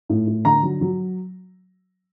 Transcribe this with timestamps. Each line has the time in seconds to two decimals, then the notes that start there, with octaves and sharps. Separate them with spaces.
0.09 A2
0.27 A2
0.45 D3 A#5
0.63 F#3
0.81 F#3